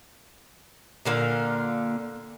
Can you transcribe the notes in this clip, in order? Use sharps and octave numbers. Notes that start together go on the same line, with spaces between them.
A#2 D3 A#3 F5